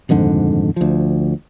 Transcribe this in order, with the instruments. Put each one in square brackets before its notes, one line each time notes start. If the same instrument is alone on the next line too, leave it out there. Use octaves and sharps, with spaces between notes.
[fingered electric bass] D#1 F2 G#2 D3
D2 F3